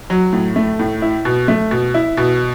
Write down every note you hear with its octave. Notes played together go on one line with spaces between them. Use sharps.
F#3
A2
A3
A2
E4
B2
A3
B2
E4
B2